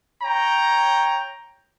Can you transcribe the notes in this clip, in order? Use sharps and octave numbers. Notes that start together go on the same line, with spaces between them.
C#5 G5 A#5